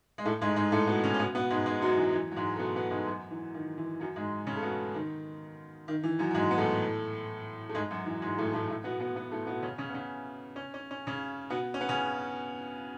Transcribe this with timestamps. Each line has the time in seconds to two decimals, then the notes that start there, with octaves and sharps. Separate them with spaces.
0.18 G#3
0.25 A2 A3
0.41 G#2 G#3
0.56 G#2 G#3
0.72 A2 A3
0.87 B2 B3
1.04 C#3 C#4
1.14 C#4
1.19 B2 B3
1.35 B2 B3
1.50 G#2 G#3
1.66 G#2 G#3
1.82 F#2 F#3
1.97 E3
2.13 E3
2.32 F#3
2.36 G#2 G#3
2.56 A3
2.59 B2 B3
2.76 B2 B3
2.91 G#2 G#3
3.06 F#2 F#3
3.31 E3
3.54 D#3
3.78 E3
4.00 F#2 F#3
4.16 G#2 G#3
4.47 C#3 C#4
4.57 A3
4.63 B2 B3
4.94 D#3
5.88 D#3
6.03 E3
6.19 F#2 F#3
6.31 F#3
6.35 G#2 G#3
6.51 B3
6.58 A2 A3
7.69 A3
7.75 G#2 G#3
7.91 F#2 F#3
8.06 E3
8.22 G#2 G#3
8.38 A2 A3
8.53 A2 A3
8.68 A2 A3
8.84 B2 B3
9.00 B2 B3
9.15 B2 B3
9.31 A2 A3
9.47 B2 B3
9.62 C#3 C#4
9.78 C#3 C#4
9.89 B3
9.94 C#3 C#4
10.56 C#4
10.74 C#4
10.91 C#4
11.07 C#3 C#4
11.50 B2 B3
11.74 C#4
11.81 B3
11.89 C#3 C#4